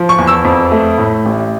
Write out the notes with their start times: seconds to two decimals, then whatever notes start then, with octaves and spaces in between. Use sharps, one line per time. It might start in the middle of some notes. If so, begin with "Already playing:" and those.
Already playing: F3
0.09 C#6
0.18 E2
0.27 E6
0.44 F2
0.72 A3
0.98 A2
1.25 A1